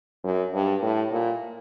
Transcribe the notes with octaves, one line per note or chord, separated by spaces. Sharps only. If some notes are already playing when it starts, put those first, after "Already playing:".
F#2
G2
A2
A#2